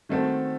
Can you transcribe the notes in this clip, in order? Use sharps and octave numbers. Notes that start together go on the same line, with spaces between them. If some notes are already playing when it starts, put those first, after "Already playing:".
D#3 A3 C4 F#4 A4